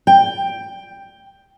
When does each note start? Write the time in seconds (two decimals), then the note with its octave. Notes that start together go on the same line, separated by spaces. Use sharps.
0.07 G5